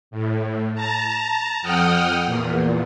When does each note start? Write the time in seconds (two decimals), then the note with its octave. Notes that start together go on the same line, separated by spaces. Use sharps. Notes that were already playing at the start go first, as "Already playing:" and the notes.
0.11 A2
0.75 A5 A#5
1.62 F2 F#5 G5 D#6 F6
2.26 E2 A#2